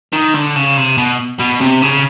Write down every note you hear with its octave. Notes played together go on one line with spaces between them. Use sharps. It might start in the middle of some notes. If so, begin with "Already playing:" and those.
D#3
D3
C#3
C3
B2
B2
C3
C#3